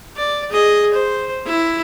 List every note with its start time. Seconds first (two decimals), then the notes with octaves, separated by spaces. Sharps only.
0.17 D5
0.50 G#4 D#5
0.94 C5
1.46 E4